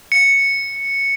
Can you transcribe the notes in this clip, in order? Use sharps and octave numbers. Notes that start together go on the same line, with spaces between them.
C#7